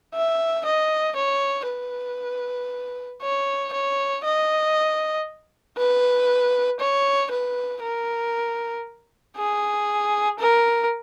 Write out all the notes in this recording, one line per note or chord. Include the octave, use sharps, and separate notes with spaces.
E5
D#5
C#5
B4
C#5
C#5
D#5
B4
C#5
B4
A#4
G#4
A#4